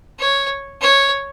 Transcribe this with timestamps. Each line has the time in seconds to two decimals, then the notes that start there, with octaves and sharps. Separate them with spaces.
0.19 C#5
0.82 C#5